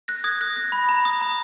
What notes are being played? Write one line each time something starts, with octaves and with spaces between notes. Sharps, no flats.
F#6 A#6
D#6 G#6
F#6 A#6
F#6 A#6
B5 A#6
A#5
D#6
A#5